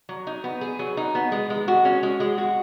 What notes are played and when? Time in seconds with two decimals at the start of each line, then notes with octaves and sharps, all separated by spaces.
0.09 F#3
0.27 D#4
0.44 B3
0.61 G#4
0.79 F#3
0.97 D#4
1.15 B3
1.32 G#3
1.50 G#3
1.68 F#4
1.85 C#4
2.03 G#3
2.20 G#3
2.38 F#4